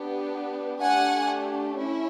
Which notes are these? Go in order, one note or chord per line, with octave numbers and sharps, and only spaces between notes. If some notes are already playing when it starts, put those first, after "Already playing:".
Already playing: B3 D4 G4
A3 D4 G4 F#5 G#5
C#4 E4